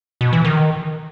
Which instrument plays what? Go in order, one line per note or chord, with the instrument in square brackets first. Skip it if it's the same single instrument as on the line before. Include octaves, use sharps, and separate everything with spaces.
[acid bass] B2
E3
D#3